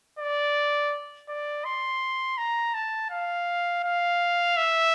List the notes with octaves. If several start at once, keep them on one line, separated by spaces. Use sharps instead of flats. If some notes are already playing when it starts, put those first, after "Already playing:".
D5
D5
C6
A#5
A5
F5
F5
E5